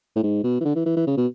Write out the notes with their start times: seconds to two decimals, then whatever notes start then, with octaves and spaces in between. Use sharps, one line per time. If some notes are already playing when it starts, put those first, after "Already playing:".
0.16 A2
0.23 G#2
0.44 B2
0.60 E3
0.65 D3
0.75 E3
0.86 E3
0.96 E3
1.07 C#3
1.17 B2